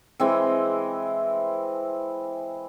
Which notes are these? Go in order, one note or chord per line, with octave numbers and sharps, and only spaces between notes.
E3 G#3 C4